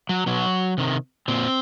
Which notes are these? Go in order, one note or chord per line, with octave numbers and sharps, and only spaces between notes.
F#3
B2 F#3
C3 D#3
A#2 C4